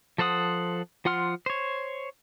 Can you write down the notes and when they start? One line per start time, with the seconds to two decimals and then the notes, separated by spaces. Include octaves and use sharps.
0.18 F3 A4 C5 F#5 D#6
1.05 F3 F4 F#5 C6 F6
1.46 C5 C#5